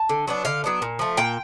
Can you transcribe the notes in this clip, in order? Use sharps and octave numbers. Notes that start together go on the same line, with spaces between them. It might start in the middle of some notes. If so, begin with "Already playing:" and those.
Already playing: A5
D3
F#3 B3 D4
D3 F5
F#3 B3 D4
A#2
F3 A3
A#2 G5